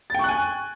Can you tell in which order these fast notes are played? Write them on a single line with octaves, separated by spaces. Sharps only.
A6 G5 C#6 F#6 G#5